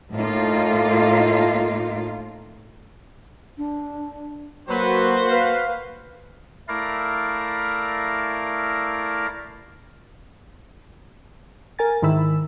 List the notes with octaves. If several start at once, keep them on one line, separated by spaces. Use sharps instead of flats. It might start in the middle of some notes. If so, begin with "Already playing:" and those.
A2 A#3 D#4 F4
D4
F#3 A#3 F#4 B4 C5
B4 F5
A3 E4 A#4 D5 F5 A#6
A#4 G#5 A6
G#2 D#3 E4 B5 E6